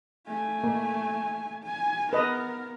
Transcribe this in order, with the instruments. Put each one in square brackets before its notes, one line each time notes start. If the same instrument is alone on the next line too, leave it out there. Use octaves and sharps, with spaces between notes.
[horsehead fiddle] A3 G#5
[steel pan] A#3
[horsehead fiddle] G#5
[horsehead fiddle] B3 A#4 [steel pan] B4 D#5